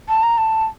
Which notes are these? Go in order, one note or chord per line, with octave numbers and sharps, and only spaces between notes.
A5
A#5
A5